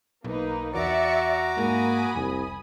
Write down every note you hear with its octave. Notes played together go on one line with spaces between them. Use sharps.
B1 A#3 D#4 B4
E2 F#4 D5 E5 A#5 D6 C#7
G#2 A#3 G#5 B5 D#6
F1 C2